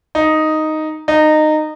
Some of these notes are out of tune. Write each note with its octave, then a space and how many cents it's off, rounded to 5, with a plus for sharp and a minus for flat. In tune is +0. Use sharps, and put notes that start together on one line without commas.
D#4 +0
D#4 -20